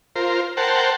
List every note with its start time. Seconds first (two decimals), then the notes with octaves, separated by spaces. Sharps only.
0.16 F4 A#4 C5
0.57 A#4 C5 F#5 G5 A5